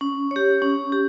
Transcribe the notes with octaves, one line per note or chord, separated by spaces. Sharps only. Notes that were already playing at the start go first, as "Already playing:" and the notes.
C#4
G4 C#5
C#4
G4